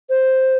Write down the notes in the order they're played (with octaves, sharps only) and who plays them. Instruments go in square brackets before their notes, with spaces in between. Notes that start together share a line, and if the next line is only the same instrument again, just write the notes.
[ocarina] C5